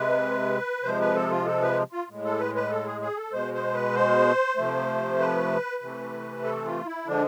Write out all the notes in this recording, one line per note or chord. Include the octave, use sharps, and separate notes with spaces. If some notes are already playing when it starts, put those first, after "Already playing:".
Already playing: C3 G#3 B4
C3 F3 G#3 C5
B4
A4
F4
A4
B4
F4
A2 G#3
A4
B4
B4
A4
G#4
G#4
A4
B2 G#3 C5
C5
B4
C5
C3 F3 A3
B4
C3 E3 A3
A4
F4
E4
D3 F3 G#3 D4